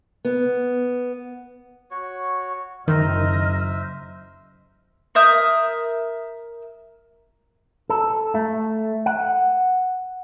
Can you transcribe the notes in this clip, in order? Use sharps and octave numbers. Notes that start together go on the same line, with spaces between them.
B3
F#4 C#5
F#1 D#3 C5 D#5 E5 A#5 F6
A#4 E5 D#6 G6
A4
A3
F#5